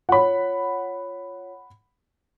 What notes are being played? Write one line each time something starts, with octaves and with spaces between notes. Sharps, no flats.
F4 C#5 F#5 B5